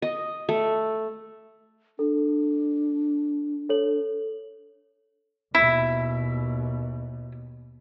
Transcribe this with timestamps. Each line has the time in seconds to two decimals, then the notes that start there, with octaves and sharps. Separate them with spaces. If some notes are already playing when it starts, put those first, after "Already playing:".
0.02 D#5
0.49 A3
1.99 D4 A4
3.69 A4 C#5 F#7
5.55 D#2 B2 E4